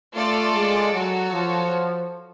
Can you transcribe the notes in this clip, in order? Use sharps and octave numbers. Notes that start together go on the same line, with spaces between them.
A3 F4 A4 D5
G#3
F#3 F#4 A4 C#5
F3